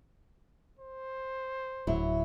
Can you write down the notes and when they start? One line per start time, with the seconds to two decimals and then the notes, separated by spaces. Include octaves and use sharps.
0.79 C5
1.87 D1 F#3 E4